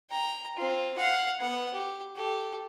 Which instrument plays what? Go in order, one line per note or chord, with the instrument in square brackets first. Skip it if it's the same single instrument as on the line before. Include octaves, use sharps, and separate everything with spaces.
[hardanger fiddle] G5 A#5
C4 F4
F5 F#5
B3 F#5
G4
G4 A4